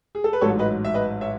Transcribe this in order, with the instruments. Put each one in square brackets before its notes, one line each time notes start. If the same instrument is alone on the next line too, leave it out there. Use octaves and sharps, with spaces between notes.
[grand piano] G#4
A4
B4
A1 G#2 F#3 A4 C#5
B4 D#5
E5
B4 D#5
C#5 E5